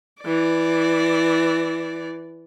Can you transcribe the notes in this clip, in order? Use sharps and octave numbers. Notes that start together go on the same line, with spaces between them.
E3 D5